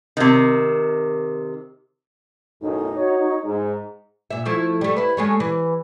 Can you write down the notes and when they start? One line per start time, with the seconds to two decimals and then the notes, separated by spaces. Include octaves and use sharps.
0.17 C3 D#3
2.62 B1 F#2 A2 D#4
2.96 F#4 C#5
3.45 G#2
4.31 A#2 E5
4.45 F3 A3 E4
4.81 G3 A3
4.96 E4 B4
5.17 G#3 A3 C#4
5.40 E3